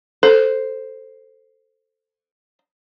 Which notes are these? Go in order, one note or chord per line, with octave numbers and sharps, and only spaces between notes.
A4 C5